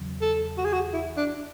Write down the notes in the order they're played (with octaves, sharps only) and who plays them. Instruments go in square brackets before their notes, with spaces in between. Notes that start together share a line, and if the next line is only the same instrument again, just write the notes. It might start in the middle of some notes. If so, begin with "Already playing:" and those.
Already playing: [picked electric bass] E2 C#3 F#3
[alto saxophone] A4
F#4
G#4
F#4
E4
D4